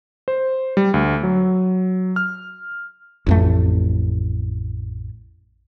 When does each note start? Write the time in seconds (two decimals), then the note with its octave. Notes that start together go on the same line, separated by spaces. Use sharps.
0.28 C5
0.77 G3
0.94 D2
1.23 F#3
2.16 F6
3.27 A1 F2 A3